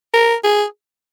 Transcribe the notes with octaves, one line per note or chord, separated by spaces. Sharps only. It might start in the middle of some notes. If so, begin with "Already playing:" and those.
A#4
G#4